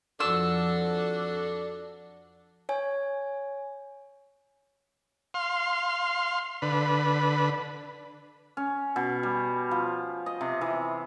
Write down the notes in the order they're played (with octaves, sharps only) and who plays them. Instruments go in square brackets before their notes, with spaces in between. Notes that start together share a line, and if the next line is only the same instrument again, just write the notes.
[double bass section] F2 F3 [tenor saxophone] D4 [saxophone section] F#4 A4 [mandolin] E6
[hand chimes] C#5 G#5
[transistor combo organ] F5 C6
D3 B4
[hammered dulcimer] C#4
B2
G3
F3
D#5
C3
E3